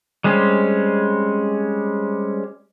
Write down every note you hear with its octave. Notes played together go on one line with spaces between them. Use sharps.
G3 G#3 C4 C#4